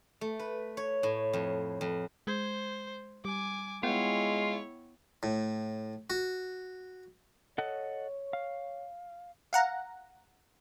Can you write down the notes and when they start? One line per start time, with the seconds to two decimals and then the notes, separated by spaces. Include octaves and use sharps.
0.21 A3
0.39 B4
0.77 C#5
1.03 A2
1.33 F2
1.81 F2
2.27 G#3 C5 G6 G#6
3.25 G3 G#5 D6
3.83 G#3 B3 E4 F4 C#5 F#5 G5
5.23 A2
6.10 F#4
7.58 A4 C#5 D#5 F#5
8.33 F5
9.53 F5 F#5 A#5